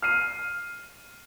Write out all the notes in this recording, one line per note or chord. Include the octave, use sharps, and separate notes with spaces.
F6 C7 D#7